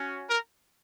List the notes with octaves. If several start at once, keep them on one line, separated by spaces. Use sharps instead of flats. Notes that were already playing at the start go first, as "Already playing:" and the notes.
Already playing: C#4 F#4
A#4